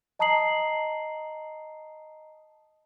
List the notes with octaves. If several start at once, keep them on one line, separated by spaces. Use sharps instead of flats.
D#5 A5 A#5 D#6 C7 F#7